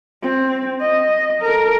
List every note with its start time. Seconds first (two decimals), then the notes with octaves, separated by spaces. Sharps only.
0.22 C4
0.81 D#5
1.42 A4 A#4